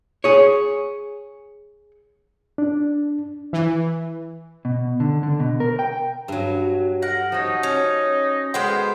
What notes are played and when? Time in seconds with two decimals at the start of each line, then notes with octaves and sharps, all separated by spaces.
0.24 G#4 C#5
2.58 D4
3.53 E3
4.65 B2
5.00 D3
5.23 D3
5.40 B2
5.60 A#4
5.79 G5
6.28 G2 F#3
7.02 A#4 F#5
7.32 F3 D#4 C#5
7.63 C#4
8.54 G#3 B3 B4 C5 F5 G5